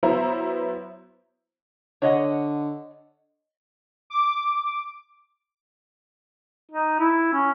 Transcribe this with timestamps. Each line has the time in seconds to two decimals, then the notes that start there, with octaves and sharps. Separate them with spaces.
0.03 F#3 B3 E4 C5 A#5
2.02 D3 C#5 D#5 F#5
4.10 D6
6.71 D#4
6.99 E4
7.33 C#4